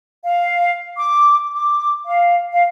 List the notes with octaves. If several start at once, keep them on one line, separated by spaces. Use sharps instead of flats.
F5
D6
D6
F5
F5